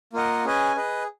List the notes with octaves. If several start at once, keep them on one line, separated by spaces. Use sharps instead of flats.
A#3 F4 A#4 D#5 F#5
C#4 G#4 B4 D#5 G#5
G#4 B4 D#5